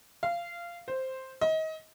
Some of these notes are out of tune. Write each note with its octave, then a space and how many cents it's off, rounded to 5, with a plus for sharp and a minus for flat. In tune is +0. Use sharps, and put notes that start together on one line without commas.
F5 -20
C5 +0
D#5 +30